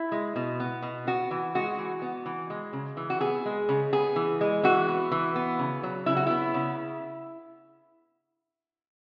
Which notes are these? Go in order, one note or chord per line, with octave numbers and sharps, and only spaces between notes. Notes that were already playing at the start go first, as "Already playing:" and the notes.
Already playing: E4
G#3
B2
B3
B2
B3 F#4
E3
G#3 F#4
E3
B3
E3
G#3
C#3
E3
F#4
B3 G#4
G#3
C#3
B3 G#4
E3
G#3
E3 F#4
B3
E3
B3
C#3
F#3
C#3 E4
F#4
B3 E4
C#3